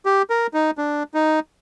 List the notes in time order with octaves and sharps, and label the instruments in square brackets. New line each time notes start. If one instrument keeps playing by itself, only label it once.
[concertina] G4
A#4
D#4
D4
D#4